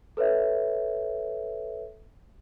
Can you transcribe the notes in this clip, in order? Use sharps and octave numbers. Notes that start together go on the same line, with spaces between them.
A4 B4 C#5 E5